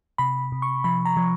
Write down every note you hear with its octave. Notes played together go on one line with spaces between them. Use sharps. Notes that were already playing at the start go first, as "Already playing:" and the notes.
C3 B5
C3
C#6
F3 B5
A#5
F3